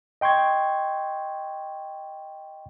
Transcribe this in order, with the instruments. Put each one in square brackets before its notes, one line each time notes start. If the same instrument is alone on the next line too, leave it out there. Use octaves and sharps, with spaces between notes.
[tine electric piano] D#5 G5 C6 C#6 G#6